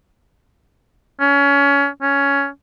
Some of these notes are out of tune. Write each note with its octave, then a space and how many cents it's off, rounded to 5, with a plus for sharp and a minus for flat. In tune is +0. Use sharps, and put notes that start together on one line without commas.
C#4 +25
C#4 +10